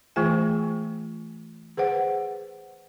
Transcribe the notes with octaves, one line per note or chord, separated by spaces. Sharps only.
E3 A3 F4 G#4 G5 G#5
G#4 B4 C5 F#5